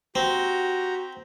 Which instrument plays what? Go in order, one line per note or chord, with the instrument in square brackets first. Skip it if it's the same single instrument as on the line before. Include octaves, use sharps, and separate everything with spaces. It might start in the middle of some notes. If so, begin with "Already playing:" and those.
[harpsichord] C4 [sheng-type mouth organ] F#4 G4 A#5